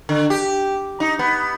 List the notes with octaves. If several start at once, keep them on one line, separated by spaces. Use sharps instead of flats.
D3
G4
D#4
B3